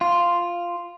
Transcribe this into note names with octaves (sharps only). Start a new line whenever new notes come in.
F4